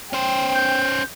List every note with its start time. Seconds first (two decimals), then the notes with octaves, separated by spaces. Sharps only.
0.13 C#4 C5 G5
0.55 G6